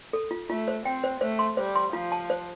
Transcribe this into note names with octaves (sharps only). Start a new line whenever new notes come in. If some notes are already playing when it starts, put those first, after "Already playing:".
A4
F4
A3 F4
C5
C4 G5
C5
A3 C5
C6
G3 C5
C6
F3 F4
A5
C5